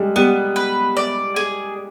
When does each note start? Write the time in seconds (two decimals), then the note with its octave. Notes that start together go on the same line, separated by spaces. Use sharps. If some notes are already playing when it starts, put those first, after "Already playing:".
Already playing: G3 G#3
0.16 G3 B3
0.56 B4
0.97 D5
1.36 G#4